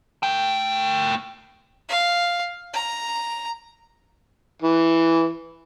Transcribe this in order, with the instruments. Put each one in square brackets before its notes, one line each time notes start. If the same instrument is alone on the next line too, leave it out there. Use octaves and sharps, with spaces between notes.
[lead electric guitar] A3 G5
[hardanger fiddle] F5
A#5
[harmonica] E3